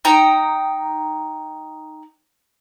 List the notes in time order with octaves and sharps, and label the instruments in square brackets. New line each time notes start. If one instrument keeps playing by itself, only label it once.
[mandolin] D#4 G5 A#5